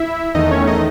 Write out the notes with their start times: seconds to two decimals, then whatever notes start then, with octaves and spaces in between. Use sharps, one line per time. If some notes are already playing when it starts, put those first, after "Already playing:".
Already playing: E4 E5
0.35 E2 D#3 A3 D#4 D#5
0.51 C#4 C#5
0.67 D#4 D#5